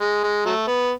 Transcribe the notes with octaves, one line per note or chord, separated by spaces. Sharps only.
G#3
G#3
F#3 A3
B3